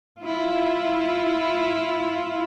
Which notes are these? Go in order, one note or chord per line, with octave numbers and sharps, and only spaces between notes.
E4 F4